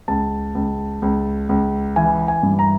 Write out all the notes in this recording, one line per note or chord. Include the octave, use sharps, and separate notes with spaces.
C#2 A5
C#2
C#2
C#2
E3 G#5
G#5
G2
A#5